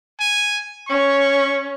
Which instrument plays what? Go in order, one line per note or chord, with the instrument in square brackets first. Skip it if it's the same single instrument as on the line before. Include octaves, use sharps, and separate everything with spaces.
[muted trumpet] G#5
[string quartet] C#4 [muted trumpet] C#6